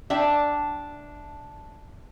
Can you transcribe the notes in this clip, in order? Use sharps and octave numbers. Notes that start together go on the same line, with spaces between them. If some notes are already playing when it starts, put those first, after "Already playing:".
D4 E5 G5